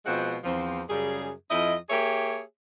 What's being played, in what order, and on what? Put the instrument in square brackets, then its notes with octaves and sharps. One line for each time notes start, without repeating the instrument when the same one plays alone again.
[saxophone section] B2 F3 G#3 C4 F4 F#5
E2 F3 C4
F#2 C#3 G3 G#4
F2 F3 E4 D#5
A#3 G4 G#4 C#5 E5